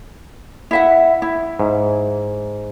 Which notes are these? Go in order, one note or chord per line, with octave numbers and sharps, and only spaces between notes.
E4 E5 F#5
E4
G#2